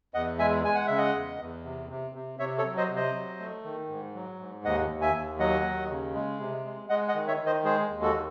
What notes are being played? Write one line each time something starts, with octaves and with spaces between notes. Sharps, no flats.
E2 D#5 F#5
G#3 E5 G#5
G#3 G#5
F#5
C#3 E5
D#5 F#5
E2
E2
C3
C3
C3
C3 C#5 E5
A4 C#5
F#3
C5 D#5
C3
C5 D#5
F#3
A3
D#3
G#2
F#3
G#2
D#2 D#5 F#5
D#2
E5 G#5
D#2
F#3 D#5 F#5
D#2
C#3
G#3
C3
G#3
G#3 D#5 F#5
D#5 F#5
D#3
C#5 E5
D#3
C5 D#5
G#3 G#4 C5
D#2
F#4 A4
D#3